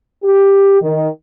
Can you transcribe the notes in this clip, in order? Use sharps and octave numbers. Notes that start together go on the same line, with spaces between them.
G4
D#3